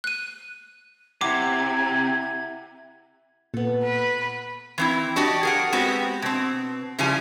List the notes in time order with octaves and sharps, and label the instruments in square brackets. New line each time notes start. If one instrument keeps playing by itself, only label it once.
[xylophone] F#6 D#7
[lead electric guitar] C3 [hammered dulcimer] E4 F#5 [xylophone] D6 [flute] G#6
[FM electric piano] A#2 [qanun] B3 A4
[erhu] B4
[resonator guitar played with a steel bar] E3 C4 E4
D4 F#4 G4 D5 D#5
G#4 A#4 F#5
G#3 B3 C4 F#4 G4
B2 C4
C#3 F3 G3 E4 G#5